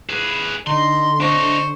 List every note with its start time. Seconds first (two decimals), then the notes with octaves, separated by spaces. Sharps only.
0.09 G#4 B4
0.67 D3 D#4 C6
1.20 D4 C5 D#5 C#6